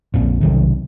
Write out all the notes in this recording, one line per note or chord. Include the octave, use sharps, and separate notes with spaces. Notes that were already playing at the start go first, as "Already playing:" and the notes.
A#1 F2 A#2
B1 C3 D#3